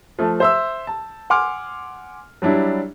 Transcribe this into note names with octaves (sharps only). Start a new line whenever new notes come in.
F3 A3
C5 E5 E6
A5
F#5 G#5 C6 D6 F6
F#3 G3 D4 E4